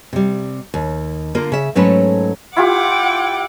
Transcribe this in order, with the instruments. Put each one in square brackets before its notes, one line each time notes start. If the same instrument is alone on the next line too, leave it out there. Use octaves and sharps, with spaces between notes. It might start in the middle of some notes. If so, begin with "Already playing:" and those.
[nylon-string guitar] C3 G3
D#2
D3 A#3 F4 A#4
C#3 E5
G#2 F#3 A3 C#4 A4 B4
[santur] E4 F4 G4 [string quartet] F#5 G5 D6